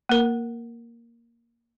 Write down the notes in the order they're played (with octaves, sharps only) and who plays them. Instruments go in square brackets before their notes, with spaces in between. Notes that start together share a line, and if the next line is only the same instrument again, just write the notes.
[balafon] A#3 A#4